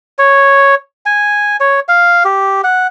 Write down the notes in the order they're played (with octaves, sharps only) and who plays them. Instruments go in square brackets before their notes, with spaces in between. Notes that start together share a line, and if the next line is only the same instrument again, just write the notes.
[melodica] C#5
G#5
C#5
F5
G4
F#5